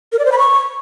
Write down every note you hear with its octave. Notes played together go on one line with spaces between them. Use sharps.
A#4
D5
C5
B5
C#6